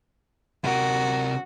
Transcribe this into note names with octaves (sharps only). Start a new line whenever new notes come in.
C3 F#4 A#4